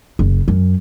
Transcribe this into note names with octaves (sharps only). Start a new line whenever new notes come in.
F#1
F#2